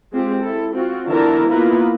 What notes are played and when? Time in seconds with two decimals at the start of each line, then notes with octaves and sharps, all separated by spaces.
0.13 G#3 C4 F4 G4
0.43 E4 A4
0.74 C4 F4 F#4
1.08 D3 E3 B3 E4 A#4 A5
1.49 A#3 B3 E4 F4 A#4 B4